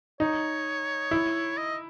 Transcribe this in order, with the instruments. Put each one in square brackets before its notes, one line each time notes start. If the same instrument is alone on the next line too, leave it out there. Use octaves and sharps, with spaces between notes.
[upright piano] D#4 [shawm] C#5
[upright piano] E4
[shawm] D#5